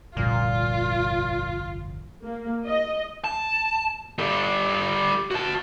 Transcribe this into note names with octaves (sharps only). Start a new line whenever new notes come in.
G1 C2 F2 A#2 F4
A#3
D#5
A5
G3 A4
F#4 A5